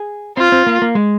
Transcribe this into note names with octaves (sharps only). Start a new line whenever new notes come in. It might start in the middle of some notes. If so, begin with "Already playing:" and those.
Already playing: G#4
C4 F4
C4
A#3
A#3
G#3